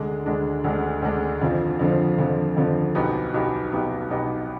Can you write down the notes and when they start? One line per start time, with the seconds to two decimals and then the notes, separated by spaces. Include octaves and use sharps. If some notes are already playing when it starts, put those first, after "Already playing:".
Already playing: D2 D3 G#3 D4
0.26 D2 D3 G#3 D4
0.64 D2 D3 G#3 D4
1.02 D2 D3 G#3 D4
1.41 F2 D3 F3
1.79 F2 D3 F3
2.18 F2 D3 F3
2.57 F2 D3 F3
2.95 B1 B2 B3 D#4 G4
3.34 B1 B2 B3 D#4 G4
3.72 B1 B2 B3 D#4 G4
4.10 B1 B2 B3 D#4 G4